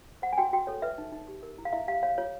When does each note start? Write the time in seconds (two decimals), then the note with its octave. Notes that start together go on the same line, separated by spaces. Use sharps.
0.22 C5 F#5
0.33 G#5
0.38 F#4 G5
0.53 F#4 G5
0.67 A4 C#5
0.82 B4 E5
0.98 D#4
1.12 D#4
1.28 G4
1.43 A#4
1.58 E4
1.65 F5
1.73 E4 E5
1.88 G4 F5
2.03 C#5 F5
2.18 F4 C#5